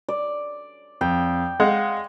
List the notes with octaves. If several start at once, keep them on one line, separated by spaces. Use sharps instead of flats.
D5
F2 G5
G#3 F5 F#5